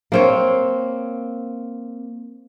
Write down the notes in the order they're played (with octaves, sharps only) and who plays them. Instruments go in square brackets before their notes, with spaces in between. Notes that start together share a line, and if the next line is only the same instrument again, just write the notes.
[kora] A#3 C4 C#5